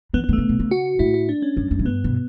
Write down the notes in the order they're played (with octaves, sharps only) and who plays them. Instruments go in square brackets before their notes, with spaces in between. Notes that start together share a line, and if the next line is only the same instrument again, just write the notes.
[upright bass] E3 [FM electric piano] B3
[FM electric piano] B3
[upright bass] D3
[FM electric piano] A3
[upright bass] C#3
B2
C#3
[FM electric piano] F#4
[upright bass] A2 [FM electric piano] E4
[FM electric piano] E4
D4
C#4
[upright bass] F#2
F#2
A2
[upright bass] G2 [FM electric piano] B3
[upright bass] B2